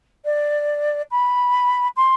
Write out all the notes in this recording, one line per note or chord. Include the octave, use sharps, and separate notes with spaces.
D5
B5
C6